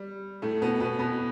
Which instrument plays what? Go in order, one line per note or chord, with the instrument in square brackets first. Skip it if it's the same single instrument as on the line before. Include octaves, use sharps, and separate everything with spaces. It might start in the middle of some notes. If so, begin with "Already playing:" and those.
Already playing: [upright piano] G3
A2 A3
B2 B3
B2 B3
B2 B3